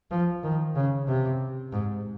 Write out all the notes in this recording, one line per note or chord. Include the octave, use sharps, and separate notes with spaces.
F3
D#3
C#3
C3
G#2